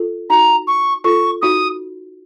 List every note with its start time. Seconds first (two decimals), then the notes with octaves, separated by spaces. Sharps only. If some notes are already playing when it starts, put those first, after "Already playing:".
Already playing: F4 A4
0.30 D#4 F#4 A#5
0.67 C#6
1.04 F4 A4 C#6
1.42 D#4 F#4 D#6